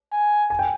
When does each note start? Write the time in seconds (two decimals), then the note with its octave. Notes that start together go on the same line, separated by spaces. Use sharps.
0.12 G#5
0.50 G#5
0.59 G5